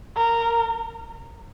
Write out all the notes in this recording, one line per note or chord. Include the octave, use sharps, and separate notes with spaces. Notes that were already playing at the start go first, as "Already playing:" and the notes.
A#4